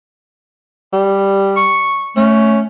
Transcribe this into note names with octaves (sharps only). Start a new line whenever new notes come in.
G3
C#6
A3 C#4